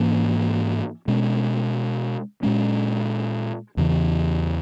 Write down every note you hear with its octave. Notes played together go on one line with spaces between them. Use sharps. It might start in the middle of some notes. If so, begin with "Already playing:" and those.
Already playing: G#2 E3 A#3 C#4
B2 G#3 C#4
A#2 G#3 C#4
E2 C#3 E3